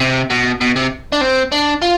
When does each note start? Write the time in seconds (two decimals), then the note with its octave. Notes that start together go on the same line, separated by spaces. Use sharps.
0.01 C3
0.31 B2
0.61 B2
0.76 C3
1.12 D4
1.21 C4
1.52 D4
1.82 F4